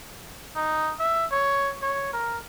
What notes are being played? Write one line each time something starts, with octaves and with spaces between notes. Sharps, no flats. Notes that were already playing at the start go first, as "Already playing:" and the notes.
D#4
E5
C#5
C#5
A#4